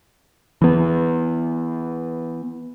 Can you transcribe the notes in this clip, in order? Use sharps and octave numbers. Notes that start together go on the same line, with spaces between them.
E3 B3